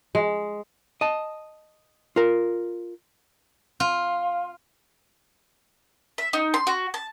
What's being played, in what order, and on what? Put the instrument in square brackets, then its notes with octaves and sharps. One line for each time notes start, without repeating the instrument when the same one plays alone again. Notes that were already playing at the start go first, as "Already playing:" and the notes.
[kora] G#3
[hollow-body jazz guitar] D#5 A5
F4 A#4
[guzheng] F4
[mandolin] E5
D#4
C6
F#4
A5